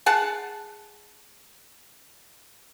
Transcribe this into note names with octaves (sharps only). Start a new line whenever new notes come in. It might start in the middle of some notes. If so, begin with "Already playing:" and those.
G#4 F#5 A5